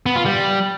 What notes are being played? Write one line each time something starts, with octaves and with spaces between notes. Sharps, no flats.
B3
F4
G3